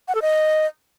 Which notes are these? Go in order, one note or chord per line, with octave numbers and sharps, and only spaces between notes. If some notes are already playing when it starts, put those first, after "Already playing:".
F#5
A4
D#5